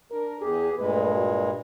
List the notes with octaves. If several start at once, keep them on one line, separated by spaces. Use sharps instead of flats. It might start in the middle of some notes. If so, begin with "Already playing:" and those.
D4 A#4
E2 G4 G#4
G2 A#2 G#3 A3 B4
F#4